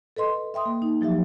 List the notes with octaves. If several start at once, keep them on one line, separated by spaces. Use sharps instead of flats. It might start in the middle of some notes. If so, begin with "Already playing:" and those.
A4 B4 D#5 C6
E5 G5 C6 D#6
A#3
D#4
F3 F#3 G4 E5